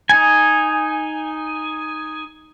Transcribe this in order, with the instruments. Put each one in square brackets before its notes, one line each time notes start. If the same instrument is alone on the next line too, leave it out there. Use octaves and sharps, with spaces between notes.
[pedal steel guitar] D#4 G#5